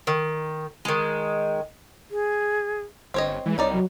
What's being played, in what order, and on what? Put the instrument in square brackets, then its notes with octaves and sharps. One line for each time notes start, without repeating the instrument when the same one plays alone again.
[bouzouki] D#3
D#3 G#3
[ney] G#4
[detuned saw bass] G1 [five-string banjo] C4 C#5 D#5
[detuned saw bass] E3 [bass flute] G#3
[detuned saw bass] C2 [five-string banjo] G3 D#4 D5 [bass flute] C#5
[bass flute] F#3